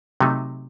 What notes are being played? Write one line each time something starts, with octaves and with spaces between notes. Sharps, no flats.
C3 F#3 A3 D#4